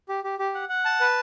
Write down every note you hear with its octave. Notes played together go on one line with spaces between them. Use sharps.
G4
G4
G4
F#5
F#5
A5
B4